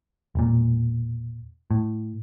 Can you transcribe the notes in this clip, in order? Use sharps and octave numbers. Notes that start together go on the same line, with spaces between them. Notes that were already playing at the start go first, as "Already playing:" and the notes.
E1 A#2
A2